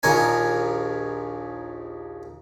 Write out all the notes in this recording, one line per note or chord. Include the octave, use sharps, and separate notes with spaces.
A#1 D#2 A#4 C#5 G#5